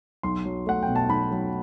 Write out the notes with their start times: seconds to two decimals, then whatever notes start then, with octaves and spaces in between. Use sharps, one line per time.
0.23 B1 C6
0.45 F#3
0.66 A3 F#5
0.83 G5
0.88 B2
0.96 A5
1.09 B1 B5
1.31 F#3